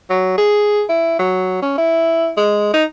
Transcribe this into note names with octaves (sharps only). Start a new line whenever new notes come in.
F#3
G#4
E4
F#3
C#4
E4
G#3
D#4